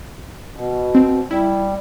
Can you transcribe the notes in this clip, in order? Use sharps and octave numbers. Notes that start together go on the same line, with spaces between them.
B2
C4
G3 E4